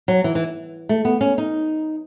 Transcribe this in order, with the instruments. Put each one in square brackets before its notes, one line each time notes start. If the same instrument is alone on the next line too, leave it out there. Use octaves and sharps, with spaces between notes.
[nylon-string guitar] F#3
E3
E3
A3
B3
C#4
D#4